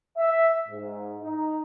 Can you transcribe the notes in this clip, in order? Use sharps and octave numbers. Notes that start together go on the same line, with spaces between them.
E5
G#2
D#4